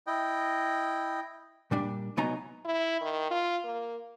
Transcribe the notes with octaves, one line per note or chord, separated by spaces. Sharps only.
E4 D#5 G5
A#2 G3 D4
C2 F#3 B3 D#4 G#5 A#5
E4
D#3
F4
A#3